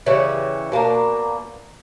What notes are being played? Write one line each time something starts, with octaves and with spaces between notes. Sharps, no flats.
C#3 E3 G3 C#4
B2 A#3 D4 A#4